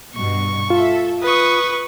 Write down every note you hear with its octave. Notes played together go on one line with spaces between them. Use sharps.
G2 B2 C#6
F4 A4 E5
B4 C#6 D#6